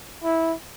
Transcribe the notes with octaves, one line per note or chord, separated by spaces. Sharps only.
E4